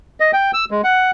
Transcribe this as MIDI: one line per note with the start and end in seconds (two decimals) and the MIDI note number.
0.20 0.31 75
0.33 0.51 79
0.54 0.65 88
0.71 0.81 56
0.84 1.11 78